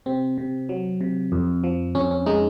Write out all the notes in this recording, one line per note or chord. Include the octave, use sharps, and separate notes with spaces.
C3 C4
C3
F#3
C3
F2
F3
F2 C#4
C#4
G#3 D#4